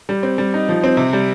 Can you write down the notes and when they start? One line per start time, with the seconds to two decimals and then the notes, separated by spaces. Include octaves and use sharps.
0.09 G3
0.23 C4
0.38 G3
0.54 D#4
0.69 F3
0.83 C4
0.97 C3
1.13 G3